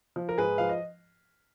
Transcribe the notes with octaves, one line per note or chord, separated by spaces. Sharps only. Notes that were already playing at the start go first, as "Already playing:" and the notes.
F3
A#4
G#2 G#4 B4
F3 F5
D#5